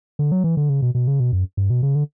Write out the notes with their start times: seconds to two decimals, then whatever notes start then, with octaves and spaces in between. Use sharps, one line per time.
0.19 D3
0.32 F#3
0.44 E3
0.57 D3
0.69 C#3
0.82 B2
0.95 B2
1.07 C#3
1.20 B2
1.32 F#2
1.57 G2
1.70 B2
1.83 C#3
1.95 D3